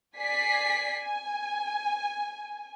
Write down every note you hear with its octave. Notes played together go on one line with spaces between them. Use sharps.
D5 G#5 B6 C7
G#5